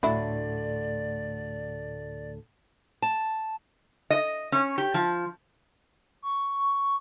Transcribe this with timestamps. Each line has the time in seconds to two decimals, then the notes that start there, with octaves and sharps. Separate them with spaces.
0.03 D2 A2 D3 F#3 A3 D4 E4 D5
3.02 A5
4.10 D#5
4.52 C#4
4.78 G4
4.94 F3
6.22 C#6